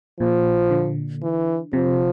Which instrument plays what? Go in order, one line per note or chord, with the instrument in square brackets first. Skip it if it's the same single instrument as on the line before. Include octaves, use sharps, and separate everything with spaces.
[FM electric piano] A#2 [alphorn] F3
[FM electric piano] D3
[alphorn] E3
[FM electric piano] C3 [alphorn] F3